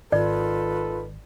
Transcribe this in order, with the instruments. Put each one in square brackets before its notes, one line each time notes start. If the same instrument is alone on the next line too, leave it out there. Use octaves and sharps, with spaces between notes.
[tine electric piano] G#1 [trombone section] D#3 A4 B4 [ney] F4 [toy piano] D5